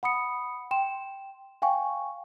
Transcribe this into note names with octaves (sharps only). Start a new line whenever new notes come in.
F#5 B5 D#6 C#7
G5 C6 E7
F5 G5 G#5 C#6